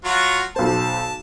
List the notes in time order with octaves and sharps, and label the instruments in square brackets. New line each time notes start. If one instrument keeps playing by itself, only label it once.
[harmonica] F#3 F4 F#4
[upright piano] B1 C5 [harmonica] A5